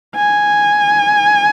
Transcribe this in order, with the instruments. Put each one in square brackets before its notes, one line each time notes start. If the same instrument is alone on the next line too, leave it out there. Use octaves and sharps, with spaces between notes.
[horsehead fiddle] G#5